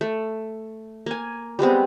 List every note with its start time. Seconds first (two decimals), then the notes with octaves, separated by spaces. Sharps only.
0.01 A3
1.06 A#3 G#5
1.59 G3 G#3 B3 C4